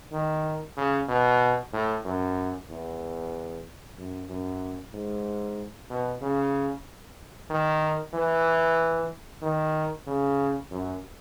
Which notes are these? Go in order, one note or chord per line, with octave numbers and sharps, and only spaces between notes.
D#3
C#3
B2
A2
F#2
E2
F#2
F#2
G#2
B2
C#3
D#3
E3
D#3
C#3
F#2